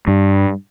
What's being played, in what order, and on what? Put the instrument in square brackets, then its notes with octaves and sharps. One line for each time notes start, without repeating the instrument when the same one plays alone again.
[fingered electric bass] G2